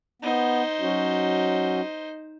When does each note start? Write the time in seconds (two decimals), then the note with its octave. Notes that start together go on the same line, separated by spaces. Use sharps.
0.22 B3 D#4 C5
0.80 F#3 C#4 F#4